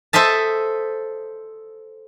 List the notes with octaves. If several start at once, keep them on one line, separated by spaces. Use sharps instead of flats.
A4 C5 D#5 E5 A5